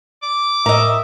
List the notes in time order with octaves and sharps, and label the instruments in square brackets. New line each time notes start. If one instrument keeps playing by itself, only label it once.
[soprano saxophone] D6
[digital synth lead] A2 [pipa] A#4 D#5 [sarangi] E5